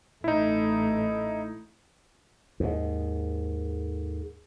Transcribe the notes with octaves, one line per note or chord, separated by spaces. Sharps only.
A1 A3 D#4 E4
D#2 G#2